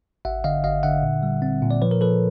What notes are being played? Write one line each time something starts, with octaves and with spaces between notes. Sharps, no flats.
G#1 E5 F#5
D3 D#5 F5
G#1 D#5 F5
D3 E5 F#5
A#2
G3
C4
A#2
D5
F3 B4 C#5
A#4
F3 A4 B4